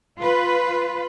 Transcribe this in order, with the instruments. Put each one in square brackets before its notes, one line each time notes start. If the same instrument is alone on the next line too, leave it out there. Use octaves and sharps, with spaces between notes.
[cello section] F4 B4